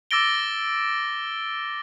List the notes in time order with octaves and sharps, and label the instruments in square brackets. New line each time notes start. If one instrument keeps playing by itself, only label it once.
[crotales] D6 E6 A6 A#6 D7 G7